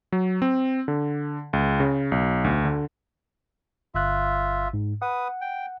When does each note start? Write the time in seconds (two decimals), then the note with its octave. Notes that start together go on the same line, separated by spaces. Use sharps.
0.12 F#3
0.42 C4
0.88 D3
1.53 C#2
1.80 C#3
2.12 B1
2.44 D2
2.65 D3
3.95 G1 F4 E5 F#6
4.74 G#2
5.02 B4 F#5 D#6
5.41 G5